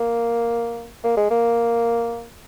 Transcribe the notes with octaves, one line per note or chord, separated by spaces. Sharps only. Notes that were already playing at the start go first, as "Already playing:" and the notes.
Already playing: A#3
A#3
G#3
A#3